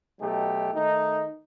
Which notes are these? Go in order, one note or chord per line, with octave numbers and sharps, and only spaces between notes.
B2 F#3 A3 D#4 G4
D#3 A3 D#4